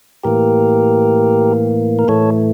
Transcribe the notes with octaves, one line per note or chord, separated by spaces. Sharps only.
A2 E3 A#3 G4 A#4
A#4
A2 E3 A3 A4 C#5